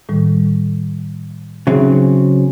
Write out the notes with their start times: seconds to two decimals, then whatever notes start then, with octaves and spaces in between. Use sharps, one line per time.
0.09 A2 D#3 G3
1.67 C#3 F#3 C4 D#4 G#4 E5